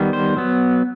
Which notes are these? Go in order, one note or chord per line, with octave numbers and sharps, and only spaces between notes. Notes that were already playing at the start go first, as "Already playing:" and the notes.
Already playing: D#3 G3 B3
C5
F#3 B3